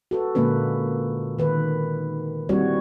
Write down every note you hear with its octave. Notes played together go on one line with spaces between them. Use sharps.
F#4 A4 B4
A#2 D3 G#3 A#3 C#4 B4
D#3 B4
G3 A#3 C4 E4 F#4 C#5